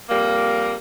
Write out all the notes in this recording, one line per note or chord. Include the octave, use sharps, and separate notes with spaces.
F2 G3 A#3